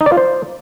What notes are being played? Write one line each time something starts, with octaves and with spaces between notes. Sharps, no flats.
D#4
D5
F4
C5